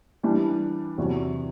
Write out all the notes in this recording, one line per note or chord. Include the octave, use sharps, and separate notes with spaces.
E3 G3 D4
E2 C3 F#3